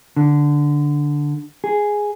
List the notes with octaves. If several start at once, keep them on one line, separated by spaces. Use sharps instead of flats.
D3
G#4